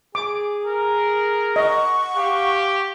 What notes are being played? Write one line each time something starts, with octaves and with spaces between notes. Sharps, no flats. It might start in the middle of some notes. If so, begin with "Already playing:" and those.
G#4 D6
A#4
D#5 F#5 C#6
G4 F5